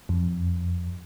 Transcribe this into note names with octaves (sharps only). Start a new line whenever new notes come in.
F2